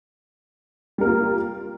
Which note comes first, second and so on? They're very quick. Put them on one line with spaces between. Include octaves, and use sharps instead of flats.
G3 A#4 A#3 F4